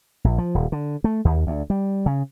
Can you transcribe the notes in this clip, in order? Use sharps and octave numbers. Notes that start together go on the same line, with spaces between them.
A#1
F3
D#1
D3
A3
D#2
D2
G3
C#3